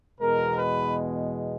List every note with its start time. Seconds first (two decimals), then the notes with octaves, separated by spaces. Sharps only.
0.20 E2 B2 G#3 A#4
0.57 B4